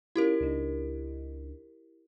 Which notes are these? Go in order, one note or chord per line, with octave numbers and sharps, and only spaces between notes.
C#4 E4 F4 G4 A#4
C#2 D4 D#4